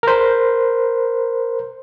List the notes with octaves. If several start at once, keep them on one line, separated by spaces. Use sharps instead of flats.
A#4 C5